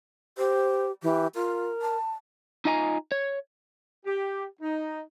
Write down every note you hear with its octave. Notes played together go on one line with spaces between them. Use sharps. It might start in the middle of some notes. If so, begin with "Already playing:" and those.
G4 C5
E3 G4
F4 A#4
A5
D#4 F4 D#5 G#5 A#5
C#5
G4
D#4